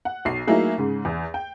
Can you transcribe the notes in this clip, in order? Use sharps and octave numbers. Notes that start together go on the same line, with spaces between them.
F#5
B1 C7
F#3 A3 A#3 D#4 E4 G#4
G#2 C#3
E2
G5